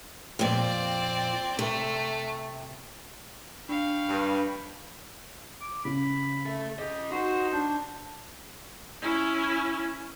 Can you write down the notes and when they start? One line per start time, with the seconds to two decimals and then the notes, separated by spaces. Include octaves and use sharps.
0.39 F2 A#2 C4 D5
1.59 C3 A3
3.69 D4 F5 G5 B5 C#6
4.08 G2
5.61 D6
5.85 C#3 B5
6.46 A4 E5
6.79 C#4 G4 G#4 D#5
7.11 D#4 F#4 C5
7.53 D4 G6
9.02 C#4 E4